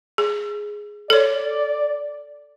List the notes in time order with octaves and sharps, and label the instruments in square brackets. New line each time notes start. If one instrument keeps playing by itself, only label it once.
[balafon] G#4
[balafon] A4 C#5 [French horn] D5